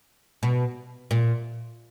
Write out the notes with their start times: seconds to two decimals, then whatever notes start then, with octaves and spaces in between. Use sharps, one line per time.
0.43 B2
1.11 A#2